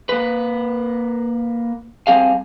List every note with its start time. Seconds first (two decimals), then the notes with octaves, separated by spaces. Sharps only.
0.09 A#3 B4
2.07 G3 C4 G#4 F5